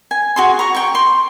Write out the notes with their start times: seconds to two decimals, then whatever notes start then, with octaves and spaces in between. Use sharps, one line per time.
0.11 G#5
0.36 F#4 G#4 C6
0.59 A#5 C#6
0.75 G5 C#6
0.95 C6